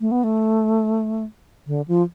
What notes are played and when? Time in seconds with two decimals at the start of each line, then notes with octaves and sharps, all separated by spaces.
0.01 A3
0.11 B3
0.24 A3
1.67 D3
1.88 F3